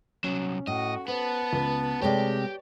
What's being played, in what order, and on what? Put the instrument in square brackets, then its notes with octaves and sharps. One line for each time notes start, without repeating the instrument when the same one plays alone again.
[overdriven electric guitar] C2 F#3 [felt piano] C#4
[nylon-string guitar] A2 [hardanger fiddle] F#4 [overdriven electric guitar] D#5
[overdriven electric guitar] B3 [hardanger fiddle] B4 A5 [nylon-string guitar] C5
[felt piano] C#2
[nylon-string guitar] C3 G#3 A3 [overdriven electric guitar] G4 [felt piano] C#5 D5